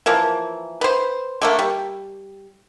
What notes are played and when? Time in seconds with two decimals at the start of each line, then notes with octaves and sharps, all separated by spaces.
0.06 E3 F3 A#3
0.81 B4 C5
1.42 D3 A3 A#3
1.59 G3